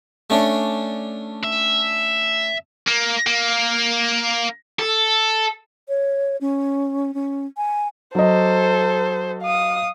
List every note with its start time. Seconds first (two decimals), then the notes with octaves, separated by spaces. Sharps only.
0.30 A3 C#4 D4
1.44 E5
2.87 A#3
3.27 A#3
4.79 A4
5.88 C#5
6.41 C#4
7.14 C#4
7.57 G#5
8.15 F#3 A4 C5 D#5
9.42 F5 D#6